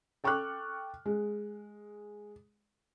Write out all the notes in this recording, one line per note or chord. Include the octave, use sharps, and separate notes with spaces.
A4 G5 C#6 D6 F6 F#6
G#3